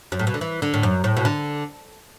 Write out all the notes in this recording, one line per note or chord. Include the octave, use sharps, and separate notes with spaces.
F#2
A2
B2
D3
E3
D3
A2
F#2
A2
B2
D3